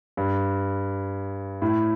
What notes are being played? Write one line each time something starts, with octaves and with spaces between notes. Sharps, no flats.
G2
A2